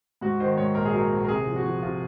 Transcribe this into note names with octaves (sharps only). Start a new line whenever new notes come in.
G#2 F#4
D#3 C5
G#2 C#5
A#1 A#4
G#4
F#3 A#4
A#1
A#4
C3 G#4
F3
F#4
F3
C3 F4